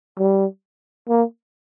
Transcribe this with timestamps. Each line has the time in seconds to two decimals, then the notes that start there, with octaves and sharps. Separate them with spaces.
0.18 G3
1.09 A#3